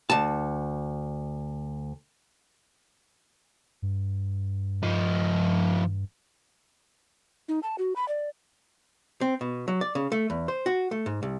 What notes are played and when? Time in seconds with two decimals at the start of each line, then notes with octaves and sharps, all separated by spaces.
0.10 D2 A5
3.82 G2
4.83 F3 D#4
7.48 D#4
7.63 A5
7.78 F#4
7.96 B5
8.08 D5
9.21 C4
9.41 B2
9.68 F#3
9.81 D5
9.95 C#3
10.12 A3
10.30 E2
10.48 C5
10.66 F#4
10.91 A3
11.06 G#2
11.23 C2